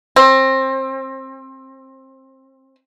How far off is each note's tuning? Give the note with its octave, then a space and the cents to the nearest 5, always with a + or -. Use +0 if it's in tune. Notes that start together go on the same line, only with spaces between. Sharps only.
C4 +25